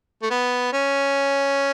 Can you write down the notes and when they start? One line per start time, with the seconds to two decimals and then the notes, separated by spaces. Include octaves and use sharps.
0.22 A3
0.31 B3
0.73 C#4